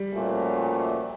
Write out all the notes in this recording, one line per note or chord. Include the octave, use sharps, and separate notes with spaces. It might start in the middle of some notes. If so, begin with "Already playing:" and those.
Already playing: G3
A#2 F3 A3 C#4 F#4